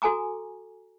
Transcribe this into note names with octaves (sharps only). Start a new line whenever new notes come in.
F#4 A4 G#5 A#5 D6